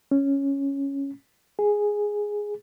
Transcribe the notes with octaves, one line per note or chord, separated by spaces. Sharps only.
C#4
G#4